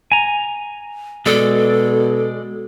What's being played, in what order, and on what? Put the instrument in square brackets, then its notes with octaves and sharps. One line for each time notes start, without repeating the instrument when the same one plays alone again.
[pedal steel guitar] G#5 A#5
[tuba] B2 [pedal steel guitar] G#3 D5 [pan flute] A4